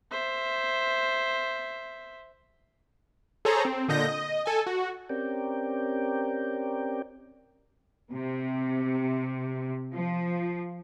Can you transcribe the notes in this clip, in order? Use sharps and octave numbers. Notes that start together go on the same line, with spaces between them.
C5 E5
G#4 A4 C5 C#5 A#5
C4
A#2 D3 D#5 G6 A#6
D#5
A4 G#5
F#4
C4 C#4 G4 A#4 D5 G5
C3
F3